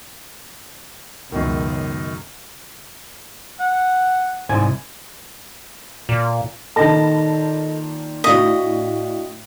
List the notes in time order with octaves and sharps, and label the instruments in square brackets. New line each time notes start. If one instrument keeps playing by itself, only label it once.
[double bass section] C#2 [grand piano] F#2 B2 D#3
[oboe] F#5
[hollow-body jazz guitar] C2 G#2 G#5
[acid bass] A#2
[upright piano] A#2 D#3 [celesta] A4 D#5 A#6 [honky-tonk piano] A5 B5
[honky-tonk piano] A2 D4 C#6 [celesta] F#4 F5 B6 [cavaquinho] D#5